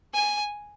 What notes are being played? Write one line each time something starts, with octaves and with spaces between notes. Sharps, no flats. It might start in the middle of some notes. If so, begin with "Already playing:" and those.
G#5